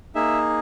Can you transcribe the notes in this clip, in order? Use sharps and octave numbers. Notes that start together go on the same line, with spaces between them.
A#3 D#4 G#4 E5